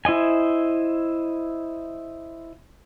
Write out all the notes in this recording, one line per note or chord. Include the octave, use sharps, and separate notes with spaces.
E4 C5 D#5 G#5